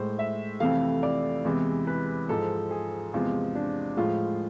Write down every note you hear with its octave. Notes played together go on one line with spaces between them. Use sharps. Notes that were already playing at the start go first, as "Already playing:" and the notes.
Already playing: A2 G#3 C5
E5
F2 C3 E3 A3 F5
D5
E2 C3 E3 G#3
B4
G#2 F3 G#3 A4
G#4
E2 C3 F3 G#3 F4
D4
A2 F3 G#3 F4